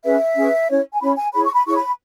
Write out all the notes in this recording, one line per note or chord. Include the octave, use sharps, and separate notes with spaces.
C#4 G#4 B4 E5
C#4 G#4 B4
C#4 E4 C#5
G#5
C#4 E4 C#5 B5
G#5
E4 G#4 C#5 B5
C#6
B5
E4 G#4 C#5 C#6
B5